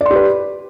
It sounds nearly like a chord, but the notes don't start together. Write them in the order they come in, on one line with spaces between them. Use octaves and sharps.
D5 C6 G4 B4